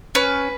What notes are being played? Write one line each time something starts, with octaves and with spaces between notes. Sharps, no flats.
C#4 B4